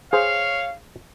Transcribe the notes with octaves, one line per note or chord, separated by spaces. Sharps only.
G#4 C5 C#5 F5